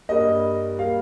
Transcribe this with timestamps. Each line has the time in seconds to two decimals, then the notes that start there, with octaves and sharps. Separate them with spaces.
0.09 G2 G3 A#3 D#5
0.79 G3 A#3 F5